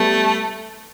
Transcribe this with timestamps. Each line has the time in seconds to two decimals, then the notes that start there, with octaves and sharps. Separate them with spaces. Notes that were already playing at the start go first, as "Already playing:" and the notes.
Already playing: G3 A3 B3